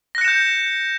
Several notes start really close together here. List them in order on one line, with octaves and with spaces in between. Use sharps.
A#6 F#6 C#7 E7 G6